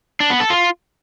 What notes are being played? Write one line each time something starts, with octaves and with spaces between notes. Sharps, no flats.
D4
B3
A4
F4